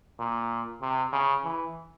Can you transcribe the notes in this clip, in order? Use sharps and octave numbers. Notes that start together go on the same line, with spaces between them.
A#2
C3
C#3
E3